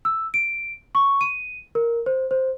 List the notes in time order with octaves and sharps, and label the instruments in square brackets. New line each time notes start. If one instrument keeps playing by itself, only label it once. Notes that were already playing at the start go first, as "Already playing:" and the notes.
[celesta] E6
D7
C#6
D#7
A#4
C5
C5